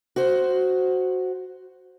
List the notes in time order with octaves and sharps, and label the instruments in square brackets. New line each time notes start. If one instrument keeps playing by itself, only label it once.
[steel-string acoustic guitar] F#4 C5